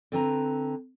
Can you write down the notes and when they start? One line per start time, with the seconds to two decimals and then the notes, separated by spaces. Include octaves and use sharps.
0.12 D3 C4 B4 A#5